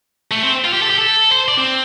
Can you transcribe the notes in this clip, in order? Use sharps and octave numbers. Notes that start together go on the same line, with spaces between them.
A3
C4
F4
G4
A4
G4
A4
C5
D5
C4